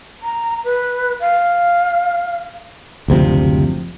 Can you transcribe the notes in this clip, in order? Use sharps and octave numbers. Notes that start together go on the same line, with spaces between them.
A#5
B4
F5
F#1 D2 C3 F3